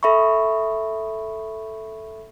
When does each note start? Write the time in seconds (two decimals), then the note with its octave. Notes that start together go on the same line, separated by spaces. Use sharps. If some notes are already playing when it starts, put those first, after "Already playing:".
0.03 A4 E5 B5 C#6